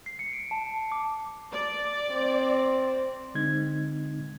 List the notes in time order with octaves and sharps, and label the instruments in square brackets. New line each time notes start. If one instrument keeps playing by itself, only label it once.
[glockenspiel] C7
C#7
D7
A5
D6
[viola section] D5
[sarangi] C4
[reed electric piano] D3 G#3 C4 D#4 G#6